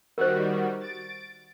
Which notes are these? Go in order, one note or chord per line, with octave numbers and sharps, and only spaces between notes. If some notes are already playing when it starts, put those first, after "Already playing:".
D#3 G3 F#4 A#4 C5
A6 D7